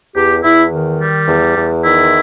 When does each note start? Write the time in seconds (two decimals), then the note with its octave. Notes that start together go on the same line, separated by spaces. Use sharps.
0.15 E2 G4
0.43 E2 E4
0.71 D#3
0.99 G3
1.27 E2
1.56 E2
1.83 D#3 E4